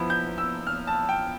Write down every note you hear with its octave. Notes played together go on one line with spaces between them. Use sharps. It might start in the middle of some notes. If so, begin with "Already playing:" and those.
Already playing: F3 B3 E4
G6
E6
F6
A5
G5